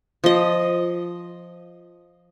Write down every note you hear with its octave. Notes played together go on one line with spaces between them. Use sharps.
F3 D#5